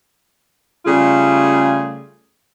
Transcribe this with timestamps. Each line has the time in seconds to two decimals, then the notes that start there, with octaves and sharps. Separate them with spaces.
0.86 C#3 G3 A3 F4 G#4